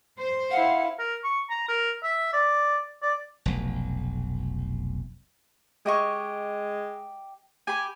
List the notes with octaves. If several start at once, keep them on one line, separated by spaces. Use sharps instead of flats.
C5
E4 F5 F#5
A#4
C#6
A#5
A#4
E5
D5
D5
F1 B1
G#3 G4 D#5 C#6
G4 G#5 B5